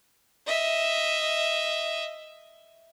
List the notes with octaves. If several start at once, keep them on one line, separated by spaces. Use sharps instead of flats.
D#5 E5